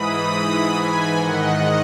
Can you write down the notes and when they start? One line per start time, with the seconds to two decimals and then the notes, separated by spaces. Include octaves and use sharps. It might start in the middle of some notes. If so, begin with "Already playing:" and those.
Already playing: G#2 E3 B5 D#6
0.28 G#2 E3 B5 D#6
0.73 G#2 E3 G#5 B5
1.17 G#2 D#3 D#5 F#5